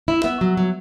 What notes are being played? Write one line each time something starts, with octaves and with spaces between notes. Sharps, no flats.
E4
B3 E5
F#3
F#3